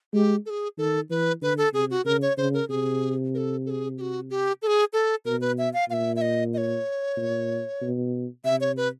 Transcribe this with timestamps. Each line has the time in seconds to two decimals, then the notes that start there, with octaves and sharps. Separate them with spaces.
0.14 G#3 G4
0.46 A4
0.50 G#4
0.78 D#3 A4
1.10 E3 B4
1.42 D3 B4
1.57 A4
1.73 C3 G#4
1.90 F#4
2.05 C#3 A#4
2.22 C#5
2.37 C#3 C5
2.54 A#4
2.69 C3 G#4
3.34 A#4
3.37 A4
3.66 A4
3.70 G#4
3.98 G4
4.01 F#4
4.30 G4
4.62 A4
4.67 G#4
4.93 A4
5.25 B2 A#4
5.41 B4
5.58 E5
5.74 F5
5.89 A#2 F5
5.93 E5
6.16 E5
6.21 D#5
6.54 D#5
6.57 C#5
7.17 A#2
7.82 B2
8.45 C3 E5
8.61 C#5
8.77 B4